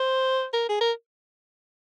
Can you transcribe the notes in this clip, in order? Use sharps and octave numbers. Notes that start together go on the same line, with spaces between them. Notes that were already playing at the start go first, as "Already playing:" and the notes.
Already playing: C5
A#4
G#4
A#4